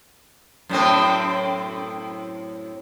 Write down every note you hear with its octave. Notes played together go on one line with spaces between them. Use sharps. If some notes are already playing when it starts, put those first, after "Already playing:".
F#2 A2 C4